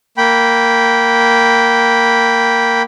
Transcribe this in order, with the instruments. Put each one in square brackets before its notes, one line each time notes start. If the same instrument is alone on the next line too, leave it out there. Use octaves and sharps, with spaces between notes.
[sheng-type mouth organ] A#3 G5 B5